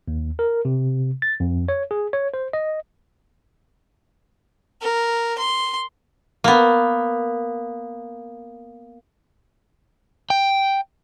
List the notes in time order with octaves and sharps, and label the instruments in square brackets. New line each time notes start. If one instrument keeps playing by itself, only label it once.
[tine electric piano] D#2
A#4
C3
A6
F2
C#5
G#4
C#5
C5
D#5
[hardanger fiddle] A#4
C6
[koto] A#3 B3
[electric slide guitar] G5